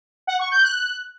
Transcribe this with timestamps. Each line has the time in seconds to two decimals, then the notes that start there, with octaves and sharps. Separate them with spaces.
0.27 F#5
0.39 C#6
0.51 G6
0.63 F#6